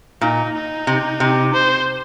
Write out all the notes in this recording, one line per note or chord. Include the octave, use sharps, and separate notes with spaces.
A#2 D#4
D#4
C3
C3
C5